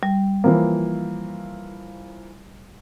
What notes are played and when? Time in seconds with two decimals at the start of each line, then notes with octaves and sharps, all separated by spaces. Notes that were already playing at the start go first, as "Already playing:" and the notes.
0.03 G3
0.44 E3 F3 A#3